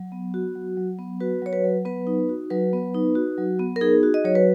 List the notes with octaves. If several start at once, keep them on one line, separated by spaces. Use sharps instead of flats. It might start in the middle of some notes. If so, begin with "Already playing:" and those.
Already playing: F#3
B3
F#4
F#3
F#3
B3
F#4 B4
F#3 C#5
B4
F#3
B3 B4
D#4
F#4
F#3 B4
B3
D#4
F#4
F#3
B3
A#4
D#4 G#4
F#4
D#5
F#3 C#5
B4